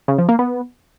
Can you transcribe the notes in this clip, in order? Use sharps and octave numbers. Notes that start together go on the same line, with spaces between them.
C#3
F3
A#3
B3